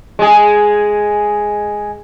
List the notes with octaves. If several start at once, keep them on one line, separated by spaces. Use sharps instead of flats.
G#3 G#4